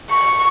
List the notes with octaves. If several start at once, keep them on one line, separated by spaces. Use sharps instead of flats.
C#6